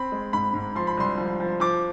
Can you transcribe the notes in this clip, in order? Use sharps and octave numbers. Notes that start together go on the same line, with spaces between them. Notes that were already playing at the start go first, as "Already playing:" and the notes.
Already playing: C4 B5
G#3
G#2 B5
G#2
F3 C6
B5
C2 C6
F3
F3
F3 D6